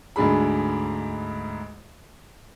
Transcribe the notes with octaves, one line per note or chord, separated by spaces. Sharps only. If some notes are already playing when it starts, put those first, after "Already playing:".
D2 G#2 D4 G#4 B5